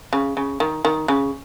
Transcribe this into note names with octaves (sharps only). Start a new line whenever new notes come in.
C#3
C#3
D#3
D#3
C#3